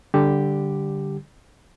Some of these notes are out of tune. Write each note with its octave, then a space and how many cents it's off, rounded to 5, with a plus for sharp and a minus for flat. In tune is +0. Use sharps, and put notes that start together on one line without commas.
D3 -5 G3 +0 G4 +0